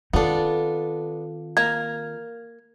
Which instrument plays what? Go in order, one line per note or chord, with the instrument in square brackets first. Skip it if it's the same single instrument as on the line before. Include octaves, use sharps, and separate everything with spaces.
[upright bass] D#3 C4 [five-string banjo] B3 D4 [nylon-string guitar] F4 A4
[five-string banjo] A#3 A#4 [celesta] G#6